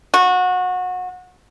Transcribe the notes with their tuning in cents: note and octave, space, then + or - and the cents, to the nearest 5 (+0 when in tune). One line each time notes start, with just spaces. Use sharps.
F#4 -25